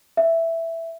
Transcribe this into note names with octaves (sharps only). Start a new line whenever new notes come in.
E5